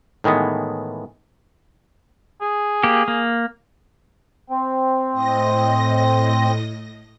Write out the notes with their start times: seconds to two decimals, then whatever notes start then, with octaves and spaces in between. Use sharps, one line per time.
0.24 A2 D#3 E3 G#3 B3
2.41 G#4
2.83 A#3 G4
3.08 A#3
4.50 C4
5.13 A2 D#5 A#6